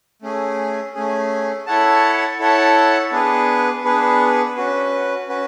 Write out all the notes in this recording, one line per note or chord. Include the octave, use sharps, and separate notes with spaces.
A3 C#4 G#4
A3 C#4 G#4
E4 A4 C#5 F#5 A5
E4 A4 C#5 F#5 A5
B3 D4 G#4 B4
B3 D4 G#4 B4
C#4 F#4 B4
C#4 F#4 B4